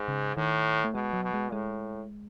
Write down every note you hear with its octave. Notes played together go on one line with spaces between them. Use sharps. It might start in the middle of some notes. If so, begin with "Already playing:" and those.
Already playing: G#2
C#3
A2 D#3
A3
B2 G#3
F#3
B2
G#3
A2 G#3